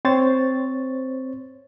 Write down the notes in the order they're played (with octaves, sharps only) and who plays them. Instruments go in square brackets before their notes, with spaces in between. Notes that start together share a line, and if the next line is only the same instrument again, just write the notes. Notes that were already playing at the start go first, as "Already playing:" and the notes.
[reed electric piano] C4 C5 C#5 A6